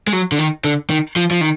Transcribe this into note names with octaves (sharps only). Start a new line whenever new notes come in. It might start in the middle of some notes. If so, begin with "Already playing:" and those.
G#3
F#3
D3
D#3
D3
D#3
F3
F3
D#3